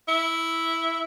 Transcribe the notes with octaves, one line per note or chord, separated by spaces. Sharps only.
E4